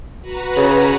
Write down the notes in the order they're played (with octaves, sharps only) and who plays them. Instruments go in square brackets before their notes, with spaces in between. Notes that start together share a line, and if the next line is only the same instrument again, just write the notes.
[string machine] F#4 B4 A#5
[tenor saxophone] C#3